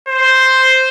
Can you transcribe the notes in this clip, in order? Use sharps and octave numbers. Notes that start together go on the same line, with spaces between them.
C5